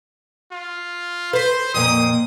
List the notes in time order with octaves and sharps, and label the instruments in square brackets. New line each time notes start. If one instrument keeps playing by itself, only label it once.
[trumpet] F4
[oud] B4 [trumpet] C5
[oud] F2 A#2 A#3 [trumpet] D#6